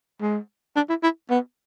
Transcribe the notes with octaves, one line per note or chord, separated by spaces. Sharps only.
G#3
D4
E4
E4
B3